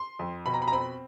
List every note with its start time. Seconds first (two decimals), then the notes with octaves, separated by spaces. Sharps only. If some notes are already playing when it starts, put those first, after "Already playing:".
Already playing: C6
0.19 F2
0.46 B2 B5
0.54 A#5
0.62 B5
0.68 A#5
0.72 C4 B5